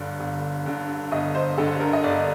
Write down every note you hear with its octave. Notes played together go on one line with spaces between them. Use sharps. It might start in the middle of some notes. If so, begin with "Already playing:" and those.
Already playing: G1 G2 D3
G1
G2 D3
G1 D#5
C5
G2 D3 A4
A#4
D#5
G1 D5